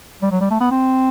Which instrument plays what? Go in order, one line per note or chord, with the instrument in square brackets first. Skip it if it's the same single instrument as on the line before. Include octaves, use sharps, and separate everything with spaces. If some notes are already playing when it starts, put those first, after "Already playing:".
[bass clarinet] G3
F#3
G3
A3
B3
C4